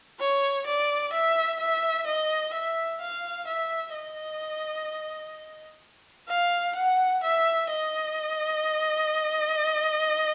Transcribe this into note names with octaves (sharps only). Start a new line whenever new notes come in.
C#5
D5
E5
E5
D#5
E5
F5
E5
D#5
F5
F#5
E5
D#5